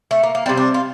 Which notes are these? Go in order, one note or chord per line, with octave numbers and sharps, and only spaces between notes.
A3
A#3
A#3
C3 G3 C4
D4
F4